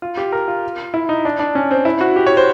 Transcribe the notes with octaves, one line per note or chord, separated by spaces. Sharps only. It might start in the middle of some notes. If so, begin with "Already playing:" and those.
F4
G4
A#4
F4
E4
D#4
D4
D4
C#4
C4
E4
F#4
G4
C#5
C5